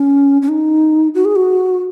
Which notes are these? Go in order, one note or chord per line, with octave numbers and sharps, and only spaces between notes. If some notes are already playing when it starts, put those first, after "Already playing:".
Already playing: C#4
C#4
D#4
F#4
G#4
F#4